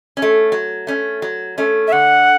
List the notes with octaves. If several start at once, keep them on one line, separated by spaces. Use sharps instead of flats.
C#4
A3
F#3
A3 C#4
F#3
A3 C#4
E5
D3 F#5